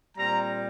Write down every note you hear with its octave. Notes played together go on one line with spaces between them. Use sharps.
A#2 G3 C4 A#5